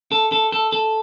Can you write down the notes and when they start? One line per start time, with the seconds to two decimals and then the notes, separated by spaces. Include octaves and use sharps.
0.12 A4
0.32 A4
0.52 A4
0.72 A4